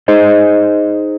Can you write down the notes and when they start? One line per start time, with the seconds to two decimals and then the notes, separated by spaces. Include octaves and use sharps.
0.08 D#4 G#4 C5 D#5